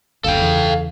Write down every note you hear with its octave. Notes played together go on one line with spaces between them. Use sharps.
F#1 D2 A4 F5 G5
E2 C#3